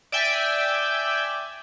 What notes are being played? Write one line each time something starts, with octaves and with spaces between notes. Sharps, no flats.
D5 E5 G5 G#5